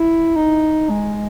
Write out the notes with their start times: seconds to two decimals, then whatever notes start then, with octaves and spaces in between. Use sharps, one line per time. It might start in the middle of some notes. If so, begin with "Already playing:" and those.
Already playing: E4
0.36 D#4
0.90 G#3